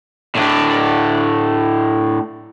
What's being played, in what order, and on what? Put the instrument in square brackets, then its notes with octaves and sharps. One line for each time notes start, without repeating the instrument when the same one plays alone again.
[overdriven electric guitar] A2 D4